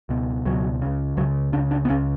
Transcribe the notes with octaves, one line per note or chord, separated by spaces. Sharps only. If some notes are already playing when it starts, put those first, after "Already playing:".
C#2 B2
C#2 B2 F#3
C#2 C#3
C#2 C#3 F#3
C#2 C#3 D4
D4
B3
C#2 C#3 C#4